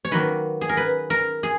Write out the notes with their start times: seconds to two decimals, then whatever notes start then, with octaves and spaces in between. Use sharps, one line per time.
0.05 C#5
0.11 D#3 F#3 A#3 B4
0.61 G#4
0.69 A#4
0.77 B4
1.10 A#4
1.43 G#4